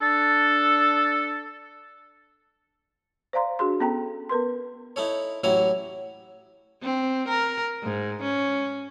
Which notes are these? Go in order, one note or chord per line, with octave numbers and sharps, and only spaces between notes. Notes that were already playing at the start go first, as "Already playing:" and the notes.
D4 A4
C5 D5 F5 A#5 C6
D4 F#4 G#4 C6
B3 C#4 A4 G5 A#5
B3 A#4 B4 C6
D#4 E4 A4 C#5
A1 F#3 E4 C#5 G5 A#5
C4
A#4
G#2
C#4